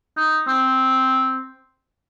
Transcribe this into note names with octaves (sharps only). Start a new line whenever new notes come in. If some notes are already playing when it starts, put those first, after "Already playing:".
D#4
C4